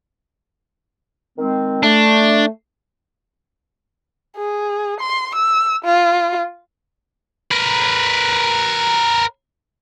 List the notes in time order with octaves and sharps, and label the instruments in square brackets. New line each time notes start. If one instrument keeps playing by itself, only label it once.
[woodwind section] D#3 G#3 C4
[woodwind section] A3 [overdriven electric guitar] D4
[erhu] G#4
C6
E6
F4
[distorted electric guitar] A#4 B4